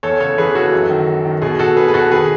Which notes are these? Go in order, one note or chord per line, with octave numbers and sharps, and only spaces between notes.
E2 A4 C#5
C#3 A4 C#5
E3 G#4 B4
E3 F#4 A4
F#2
D#3
D#3
D#3
B2 G#4
B2 F#4 A4
B2 G#4 B4
B4
B2 F#4 A4
D#3 G#4 B4